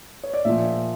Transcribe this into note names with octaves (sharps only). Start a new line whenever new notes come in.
C#5
D5
A#1 A#2 F3 E5